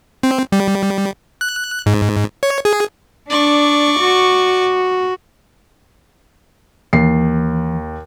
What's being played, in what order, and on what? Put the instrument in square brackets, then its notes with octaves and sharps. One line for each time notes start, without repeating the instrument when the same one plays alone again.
[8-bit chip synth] C4
G3
F#6
G#2
C#5
G#4
[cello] D4 [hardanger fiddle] D5 C#6
[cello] F#4
[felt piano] D#2 C7 [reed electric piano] E3